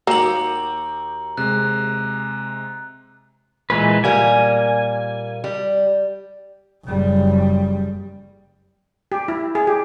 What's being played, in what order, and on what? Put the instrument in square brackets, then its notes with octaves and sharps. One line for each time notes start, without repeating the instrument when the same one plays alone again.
[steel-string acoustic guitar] D#2 F#4 [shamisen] A#3 [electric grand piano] G5 D6 E6 [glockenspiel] A#5 F#7
[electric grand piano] C3 G#3 [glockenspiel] F#6
[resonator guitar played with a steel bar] A#2 [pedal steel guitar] E3 G#3 B4
[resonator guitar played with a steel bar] A#2 G3 A#3 [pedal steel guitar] G#5
[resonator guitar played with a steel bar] G3
[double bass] F#1 G3
[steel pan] G4
E4
G#4
G4